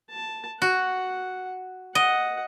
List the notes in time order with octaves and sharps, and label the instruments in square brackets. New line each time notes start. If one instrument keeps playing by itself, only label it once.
[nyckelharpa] A5
[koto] F#4 [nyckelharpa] F#5
[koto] D#5 [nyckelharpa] F#5